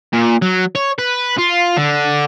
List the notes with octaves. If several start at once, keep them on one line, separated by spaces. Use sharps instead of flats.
A#2
F#3
C#5
B4
F4
D3